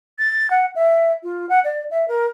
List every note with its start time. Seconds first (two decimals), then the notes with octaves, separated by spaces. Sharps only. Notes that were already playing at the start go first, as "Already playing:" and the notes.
0.18 A6
0.50 F#5
0.75 E5
1.23 F4
1.49 F#5
1.64 D5
1.91 E5
2.08 A#4